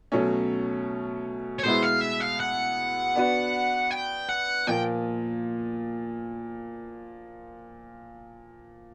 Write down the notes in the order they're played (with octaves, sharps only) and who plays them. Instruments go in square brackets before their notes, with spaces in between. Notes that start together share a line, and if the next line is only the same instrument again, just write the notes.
[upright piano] B2 F#3 A3 C#4
[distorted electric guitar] C#5
[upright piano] B2 G#3 B3 E4 [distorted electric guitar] C5
[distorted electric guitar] F5
E5
F5
F#5
[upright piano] B3 D4 F#4 B4
[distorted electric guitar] G5
F#5
[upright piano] A#2 F3 A#3 [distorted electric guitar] G5